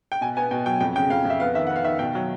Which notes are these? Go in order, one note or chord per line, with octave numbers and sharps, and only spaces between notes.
G5
B2 G#5
B3 G#5
B2 G5
F#3 G5
F2 G5
C#3 G5
F2 F5
F2 E5
B3 F5
D#3 E5
B3 F#5
F5
D#3 E5
B2 G5
F#3